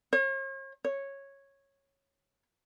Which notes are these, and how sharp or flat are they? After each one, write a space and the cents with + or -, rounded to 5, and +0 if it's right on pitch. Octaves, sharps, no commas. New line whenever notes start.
C#5 -45
C#5 -10